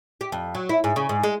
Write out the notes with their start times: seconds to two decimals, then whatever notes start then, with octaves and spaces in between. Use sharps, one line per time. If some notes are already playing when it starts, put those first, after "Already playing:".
0.21 G4
0.32 F2
0.55 F#3
0.69 E4
0.84 G#2
0.96 C#3
1.09 G#2
1.23 G#3